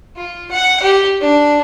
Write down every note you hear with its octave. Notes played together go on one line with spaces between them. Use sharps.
F4
F#5
G4
D4